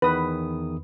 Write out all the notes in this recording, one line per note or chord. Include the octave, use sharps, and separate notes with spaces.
E2 D#3 B4 D#6